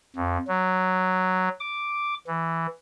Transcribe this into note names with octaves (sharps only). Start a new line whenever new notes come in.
F2
F#3
D6
E3